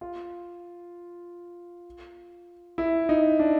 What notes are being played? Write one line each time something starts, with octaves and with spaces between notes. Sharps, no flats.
F4
E4
D#4
D4